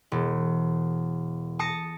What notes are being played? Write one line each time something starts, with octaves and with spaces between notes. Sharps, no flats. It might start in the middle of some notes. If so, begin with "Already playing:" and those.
E1
A5 D#6 A#6 C#7